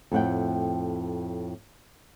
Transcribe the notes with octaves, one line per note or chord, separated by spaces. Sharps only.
F2 A2 F#5 G5